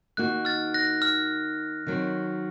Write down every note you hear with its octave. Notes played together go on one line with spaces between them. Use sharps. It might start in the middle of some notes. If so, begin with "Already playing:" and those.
D#3 A#3 D#4 F#4 F#6
F6 A6
F#6 A#6
F6
D#3 F#3 C4